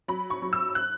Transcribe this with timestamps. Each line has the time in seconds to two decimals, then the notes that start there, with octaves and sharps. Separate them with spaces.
0.08 F#3 B5
0.30 C#6
0.42 F#3
0.53 E6
0.75 F#6